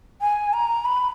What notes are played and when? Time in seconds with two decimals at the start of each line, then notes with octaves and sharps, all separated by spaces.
0.21 G#5
0.53 A#5
0.85 B5